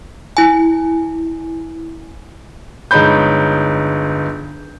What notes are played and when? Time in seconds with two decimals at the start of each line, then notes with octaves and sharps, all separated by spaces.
0.37 E4 G#5
2.91 G1 G#3 D#4 C#5 B5 G6